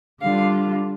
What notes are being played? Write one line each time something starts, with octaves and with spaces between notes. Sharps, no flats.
D3 G3 D4 F4 F5